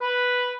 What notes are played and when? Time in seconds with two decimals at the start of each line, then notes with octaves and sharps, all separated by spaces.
0.01 B4